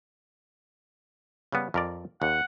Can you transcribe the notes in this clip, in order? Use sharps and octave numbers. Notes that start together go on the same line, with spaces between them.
C#3 G3 B3
F2 A#4 D5
D#2 F#5